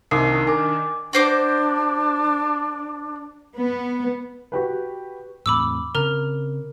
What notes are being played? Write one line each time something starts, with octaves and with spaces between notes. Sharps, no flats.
C2 D#3 D4 D#4 A#4 D6 D#6 C7
A#4 G#5 D6
D4 F#4 C5 D6
B3
F#4 G4 B4
E2 A2 C4 B5 D6 E6
C#3 C4 A#4 A#5 F6